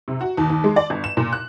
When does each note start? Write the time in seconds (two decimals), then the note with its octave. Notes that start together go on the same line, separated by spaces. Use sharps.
0.08 C3
0.21 F#4
0.37 D#2
0.50 D#2
0.64 G#3
0.76 D5
0.90 G1
1.04 E7
1.17 A#2
1.33 F#6